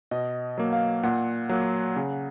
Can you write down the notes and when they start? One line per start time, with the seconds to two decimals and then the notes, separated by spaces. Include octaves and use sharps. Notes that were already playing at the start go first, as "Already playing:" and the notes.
0.11 B2 D#5
0.58 F#3 A#3
0.73 F5
1.03 A#2 F#5
1.49 F#3 A#3 F#5
1.96 C#3